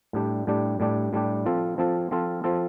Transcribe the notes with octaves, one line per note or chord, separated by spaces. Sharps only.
A2 G3 D4 G4
A2 G3 D4 G4
A2 G3 D4 G4
A2 G3 D4 G4
F3 C4 F4 A4
F3 C4 F4 A4
F3 C4 F4 A4
F3 C4 F4 A4